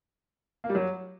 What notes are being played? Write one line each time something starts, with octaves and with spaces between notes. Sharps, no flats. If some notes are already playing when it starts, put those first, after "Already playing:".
A#3
G3
F#3